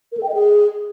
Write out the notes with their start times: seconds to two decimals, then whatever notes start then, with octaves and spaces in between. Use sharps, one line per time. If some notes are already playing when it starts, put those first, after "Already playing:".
0.12 A#4
0.17 A4
0.23 G5
0.29 D#5
0.34 G#4